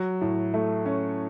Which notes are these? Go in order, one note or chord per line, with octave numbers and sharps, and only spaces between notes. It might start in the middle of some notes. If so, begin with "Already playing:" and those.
Already playing: F#3
A2
A3
C#4